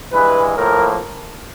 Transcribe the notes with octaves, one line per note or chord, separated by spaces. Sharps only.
G2 E3 G#3 B4
A2 F3 A#3 A#4